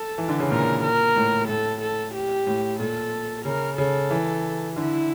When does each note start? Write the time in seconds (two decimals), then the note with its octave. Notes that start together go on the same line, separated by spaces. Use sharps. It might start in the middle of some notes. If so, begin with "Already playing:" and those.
Already playing: A4
0.18 E3
0.28 D3
0.40 C#3
0.50 A#2 A#4
0.83 A#4
1.16 A2
1.48 A2 A4
1.82 A4
2.14 G4
2.47 A2
2.80 A#2 A4
3.45 C#3 A#4
3.78 C#3 A4
4.11 E3
4.76 D3 E4